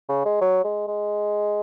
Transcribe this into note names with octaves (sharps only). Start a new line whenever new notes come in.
C#3
G#3
F#3
G#3
G#3